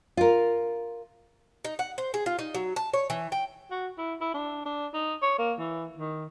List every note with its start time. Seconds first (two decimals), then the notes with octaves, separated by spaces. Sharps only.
0.17 F4 A#4
1.65 D#4
1.79 F#5
1.98 C5
2.14 G#4
2.26 F4
2.39 D#4
2.55 F#3
2.76 A5
2.93 C#5
3.10 E3
3.32 G5
3.70 F#4
3.97 E4
4.21 E4
4.34 D4
4.65 D4
4.93 D#4
5.22 C#5
5.38 A#3
5.59 E3
5.97 D#3